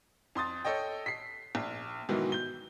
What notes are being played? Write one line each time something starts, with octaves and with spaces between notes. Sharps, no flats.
F2 C6 D#6 A6
A4 C#5 D#5 G5
B6 C7
A#1
G#2 B2 D#3 E3 F#3
G6 G7